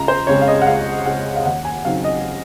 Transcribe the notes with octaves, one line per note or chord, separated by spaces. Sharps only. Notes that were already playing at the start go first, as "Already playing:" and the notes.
Already playing: C#2 A#5
C5
C#3 G#3 C4 C#5
F5
D#5
F#5
C#2 F5
C#3 G#3 C4 F#5
F5
D#2 F#5
G#5
C#3 F#3 C4 D#4 F5
D#5